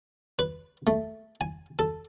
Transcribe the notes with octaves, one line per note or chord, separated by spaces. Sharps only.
B4
A3
G#5
A4